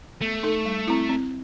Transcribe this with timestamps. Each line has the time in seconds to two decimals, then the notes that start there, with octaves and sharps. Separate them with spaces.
0.21 A3 B3
0.43 D#4 A4
0.65 G3
0.88 C4 E4
1.10 C4